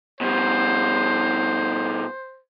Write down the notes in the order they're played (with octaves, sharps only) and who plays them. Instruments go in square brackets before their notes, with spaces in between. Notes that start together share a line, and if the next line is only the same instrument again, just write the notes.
[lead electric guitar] B2 G3 [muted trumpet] C5